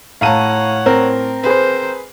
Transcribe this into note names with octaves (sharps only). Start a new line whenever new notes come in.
A2 C#5 F5 F#5 A5 A#5 D#7
C4 A#4
G#4 B4 C5